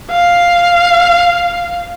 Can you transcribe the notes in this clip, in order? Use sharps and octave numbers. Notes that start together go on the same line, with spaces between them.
F5